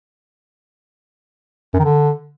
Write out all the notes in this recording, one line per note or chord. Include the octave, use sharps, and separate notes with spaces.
F#2
D#3
D3